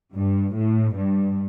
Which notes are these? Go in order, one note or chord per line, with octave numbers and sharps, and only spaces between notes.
G2
A2
G2